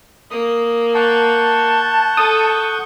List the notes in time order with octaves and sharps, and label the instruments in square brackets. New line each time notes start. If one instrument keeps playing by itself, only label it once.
[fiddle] A#3 [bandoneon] D#6
[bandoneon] F#5 C#6 G6 [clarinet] A5
[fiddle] A4 [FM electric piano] D#6